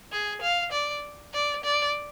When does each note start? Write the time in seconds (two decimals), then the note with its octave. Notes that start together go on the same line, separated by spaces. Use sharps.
0.12 G#4
0.42 F5
0.72 D5
1.33 D5
1.64 D5